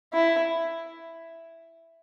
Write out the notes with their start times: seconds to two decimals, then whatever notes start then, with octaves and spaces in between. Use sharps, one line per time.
0.13 E4